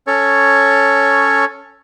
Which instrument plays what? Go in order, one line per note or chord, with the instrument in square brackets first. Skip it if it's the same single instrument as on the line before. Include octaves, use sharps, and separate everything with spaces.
[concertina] C#4 A4 C#5